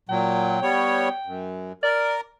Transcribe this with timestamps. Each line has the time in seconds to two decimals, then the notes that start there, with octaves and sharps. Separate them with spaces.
0.09 A#2 F#3 G5
0.62 G3 B3 C#5
1.26 F#2
1.83 A#4 D5